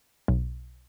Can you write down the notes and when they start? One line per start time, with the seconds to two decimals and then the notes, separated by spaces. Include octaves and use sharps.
0.28 B1